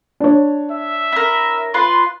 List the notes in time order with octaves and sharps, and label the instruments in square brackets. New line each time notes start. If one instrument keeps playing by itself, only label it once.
[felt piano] D4 C#5
[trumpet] E5
[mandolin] E4 A#4
[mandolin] F4 B4 [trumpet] C6